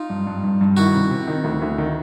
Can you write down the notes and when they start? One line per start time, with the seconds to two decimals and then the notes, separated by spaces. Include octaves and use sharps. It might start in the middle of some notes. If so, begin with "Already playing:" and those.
Already playing: D#4 F4
0.10 G2
0.27 G2
0.44 G2
0.61 G2
0.77 D#3 E4 F#4
0.94 C3
1.11 C3
1.28 D#3
1.44 D2
1.62 D2
1.78 D#3